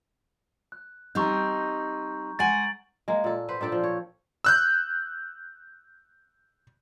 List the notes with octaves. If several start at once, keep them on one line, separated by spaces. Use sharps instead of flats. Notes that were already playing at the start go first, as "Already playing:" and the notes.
F#6
G3 C4 D#4 A#5 C#6 G6
G#3 F#5 G#5 A6 D7 F#7
G#3 A#3
A#2 A4
B4 C5 F#5
A#2 D4 A4 G5
F3
C#5
E6 F#6 G6